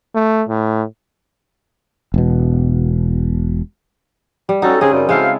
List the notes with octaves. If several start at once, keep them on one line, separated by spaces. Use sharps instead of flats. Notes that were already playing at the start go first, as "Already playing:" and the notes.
A3
A2
E1 B2
G3
C#4 D#4 F#4 A4
C#3 C4 G#4 D#5
F#2 G3
G#3 E4 F#4 A4 C5 F5